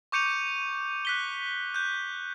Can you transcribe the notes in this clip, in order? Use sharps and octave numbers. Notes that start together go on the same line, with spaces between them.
C#6 D6 G6 C#7 D#7 F7
F#6 B6 G7
F#6 G6